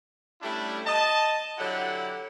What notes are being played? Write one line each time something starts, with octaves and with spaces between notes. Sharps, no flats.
G3 A3 C#4 D4 E4
D#5 A5
D3 F#3 E4 G4 F#5